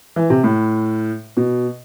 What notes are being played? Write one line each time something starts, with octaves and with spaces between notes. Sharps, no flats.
E3
C3
A2
B2